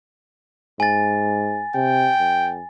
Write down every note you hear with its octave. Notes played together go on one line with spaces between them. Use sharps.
G#2 G#5 A6
C3 G5
F2